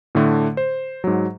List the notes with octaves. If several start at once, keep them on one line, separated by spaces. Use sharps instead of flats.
A2 D3 A3
C5
G#2 F#3